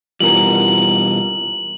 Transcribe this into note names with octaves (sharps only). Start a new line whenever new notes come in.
B2 E3 G3 F4 A#4 A#5 F#7